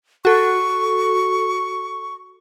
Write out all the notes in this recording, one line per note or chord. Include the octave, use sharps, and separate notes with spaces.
F#4 A4 C#6